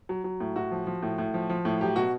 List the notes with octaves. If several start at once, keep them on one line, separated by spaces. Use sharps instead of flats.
F#3
F#3
A2
A2 F#4
F3
F3
A2
A2
F3
F3
A2
F#3 G4
B2 F#4